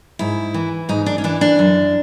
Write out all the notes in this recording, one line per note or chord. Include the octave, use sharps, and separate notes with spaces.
G#2 E4
E3
G#2 D#4
D4
C#4
E3 D4
D4
F#2